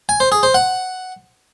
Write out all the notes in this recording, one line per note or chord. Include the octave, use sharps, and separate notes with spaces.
G#5
C5
G#4
C5
F#5